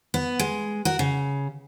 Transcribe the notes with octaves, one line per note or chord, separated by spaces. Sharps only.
B3
G#3
F#4 A#4
C#3